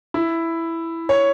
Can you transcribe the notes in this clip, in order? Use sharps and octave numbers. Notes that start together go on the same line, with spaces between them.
E4
C#5